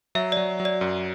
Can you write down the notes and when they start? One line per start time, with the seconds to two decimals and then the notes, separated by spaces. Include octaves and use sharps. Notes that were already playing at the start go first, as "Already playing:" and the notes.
0.15 F#3 E5
0.32 F#3 D5
0.60 F#3
0.65 D5
0.81 F#2